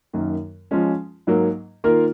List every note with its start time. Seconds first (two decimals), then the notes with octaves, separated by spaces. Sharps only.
0.13 F#2 D#3 A#3
0.71 F3 G#3 C#4
1.27 G#2 F#3 A#3
1.84 D#3 A#3 F4 A#4